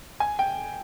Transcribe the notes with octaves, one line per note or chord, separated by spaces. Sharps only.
G#5
G5